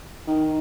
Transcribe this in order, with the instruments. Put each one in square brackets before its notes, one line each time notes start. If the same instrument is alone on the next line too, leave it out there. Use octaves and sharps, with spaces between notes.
[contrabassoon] D#3